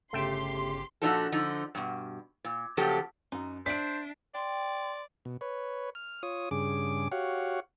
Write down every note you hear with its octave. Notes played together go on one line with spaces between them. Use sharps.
G1 C#3 A3 G4 E5 G5 C6
A#2 F3 D4 D#4 F#4 A4
D3 F3 D#4
G2 B2
A#2
C#3 F3 F#3 A#3 G4 A4
F#2 D#4 F#4
D4 C5 D5 E5 F#5 B6 D7
D5 G5 C6
B2
B4 C#5
F6
F4 C#5 D#6
G2 C#3 G#4 D6
F#4 G4 C#5 F5 F#5